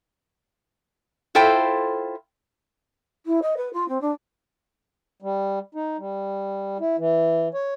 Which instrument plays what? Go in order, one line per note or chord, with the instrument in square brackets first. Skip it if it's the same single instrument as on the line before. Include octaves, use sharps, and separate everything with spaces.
[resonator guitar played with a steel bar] E4 F4 A4 C5 G5
[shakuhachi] E4
D#5
B4
F4
C4
D4
[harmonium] G3
D#4
G3
E4
E3
C#5